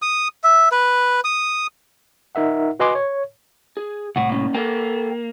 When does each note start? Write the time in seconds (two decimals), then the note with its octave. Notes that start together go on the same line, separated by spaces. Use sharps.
0.02 D#6
0.44 E5
0.72 B4
1.24 D#6
2.35 D#4 A#4 E5 F#5
2.80 F#4 B4 D#5 G#5 C6 D6
2.95 C#5
3.77 G#4
4.16 C2 A2 F#5
4.30 A#3 C#4
4.54 A#3 A4 B4 G5